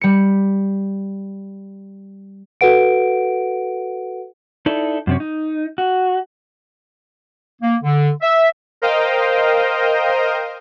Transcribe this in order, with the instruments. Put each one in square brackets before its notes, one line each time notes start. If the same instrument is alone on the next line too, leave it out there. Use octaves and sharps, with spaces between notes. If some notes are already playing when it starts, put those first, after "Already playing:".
[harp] G3 C#7
[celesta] F#4 A4 B4 F#5 D7
[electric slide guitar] D#4 E4 A4 D5
F#2 C3 C#4
D#4
F#4
[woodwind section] A#3
D3
E5
[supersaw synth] A#4 C5 D#5 F5 G5